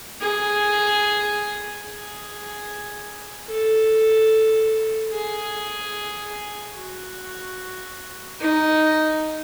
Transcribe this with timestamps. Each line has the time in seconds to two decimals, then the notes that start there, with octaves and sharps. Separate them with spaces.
0.20 G#4
1.84 G#4
3.49 A4
5.12 G#4
6.76 F#4
8.40 D#4